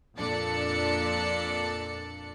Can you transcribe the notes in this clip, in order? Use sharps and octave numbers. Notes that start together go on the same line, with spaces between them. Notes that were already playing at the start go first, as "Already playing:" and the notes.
F2 A#2 D4 A4 D5 C#7